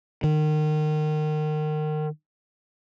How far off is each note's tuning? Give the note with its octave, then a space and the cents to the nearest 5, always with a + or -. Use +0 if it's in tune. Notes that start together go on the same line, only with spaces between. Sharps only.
D#3 -30